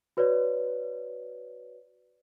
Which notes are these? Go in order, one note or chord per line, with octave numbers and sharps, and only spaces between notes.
F#4 B4 C#5 D5